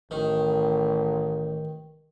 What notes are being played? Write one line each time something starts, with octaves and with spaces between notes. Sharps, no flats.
A1 D#3